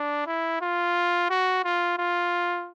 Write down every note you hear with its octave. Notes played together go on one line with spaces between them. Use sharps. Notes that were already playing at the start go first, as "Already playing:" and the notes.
Already playing: D4
E4
F4
F#4
F4
F4